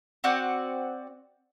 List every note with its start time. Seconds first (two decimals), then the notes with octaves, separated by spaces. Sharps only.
0.24 C4 F#4 D5 F#5